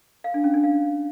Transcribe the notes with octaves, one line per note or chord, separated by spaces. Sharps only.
F5
D4
C#4
D4
F5